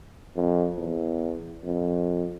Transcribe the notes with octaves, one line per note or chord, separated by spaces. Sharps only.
F2
E2
F2